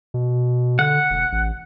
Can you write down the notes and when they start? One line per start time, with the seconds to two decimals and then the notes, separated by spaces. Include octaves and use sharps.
0.14 B2
0.79 D3 F#5
1.10 E1
1.32 A1